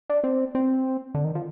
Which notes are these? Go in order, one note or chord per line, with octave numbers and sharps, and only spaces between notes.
D4
C4
C4
D3
D#3
F3